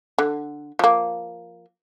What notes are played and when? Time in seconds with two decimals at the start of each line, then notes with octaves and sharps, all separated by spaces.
0.18 D3
0.79 F3 A#3